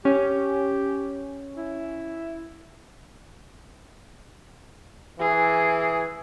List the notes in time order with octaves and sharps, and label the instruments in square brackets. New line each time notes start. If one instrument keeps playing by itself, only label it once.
[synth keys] C#4 [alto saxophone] G4
[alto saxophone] E4
[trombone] E3 [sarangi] G#4